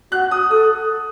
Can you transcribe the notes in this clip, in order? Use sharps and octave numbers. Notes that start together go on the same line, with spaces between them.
F#4 F#6
D#6
A4 D#6